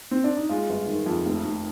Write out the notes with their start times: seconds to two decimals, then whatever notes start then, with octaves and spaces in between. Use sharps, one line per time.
0.11 C4
0.24 D4
0.37 D#4
0.49 G#3 F4
0.70 G1
0.87 D#3
1.06 F2
1.26 F1
1.45 F1